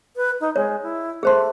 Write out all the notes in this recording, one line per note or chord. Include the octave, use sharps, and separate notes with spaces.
B4
D#4
G#3 C#5
E4
A3 G#4 C5 C6